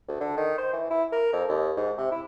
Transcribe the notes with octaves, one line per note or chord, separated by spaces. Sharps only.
D2
D3
D#3
C5
E3
E4
A#4
F2
D#2
G#2
C3
E4